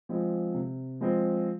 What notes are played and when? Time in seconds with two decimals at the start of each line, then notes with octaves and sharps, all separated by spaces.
0.09 F3 G#3 C4
0.54 C3
1.01 F3 G#3 C4